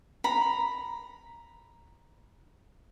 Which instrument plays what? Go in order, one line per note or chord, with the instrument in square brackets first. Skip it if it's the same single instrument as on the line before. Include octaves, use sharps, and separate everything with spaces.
[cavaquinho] A#5 B5